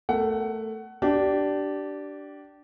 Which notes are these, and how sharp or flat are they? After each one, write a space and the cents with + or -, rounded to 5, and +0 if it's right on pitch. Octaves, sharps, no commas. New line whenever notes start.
A3 +5 A#4 -10 F#5 +20
D4 -5 G4 -25